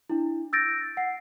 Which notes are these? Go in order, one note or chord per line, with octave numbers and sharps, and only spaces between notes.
D4 E4
E6 G6 A6 A#6 D7
F#5 C7